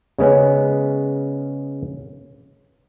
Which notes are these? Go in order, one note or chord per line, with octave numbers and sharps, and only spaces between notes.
C#3 G#3 B3 C#4